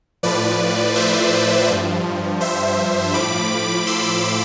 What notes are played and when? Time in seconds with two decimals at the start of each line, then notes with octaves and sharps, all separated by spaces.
0.23 A2 F3 B4 D5
0.95 C5 E5
1.68 G2 F3
2.41 C5 E5
3.13 A2 F3 B5 D6
3.87 C6 E6